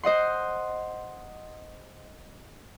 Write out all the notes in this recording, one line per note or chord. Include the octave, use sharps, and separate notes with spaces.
C5 D#5 F#5 C6